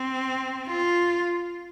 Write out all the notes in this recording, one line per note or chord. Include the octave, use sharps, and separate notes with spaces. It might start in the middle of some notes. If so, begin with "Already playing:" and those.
Already playing: C4
F4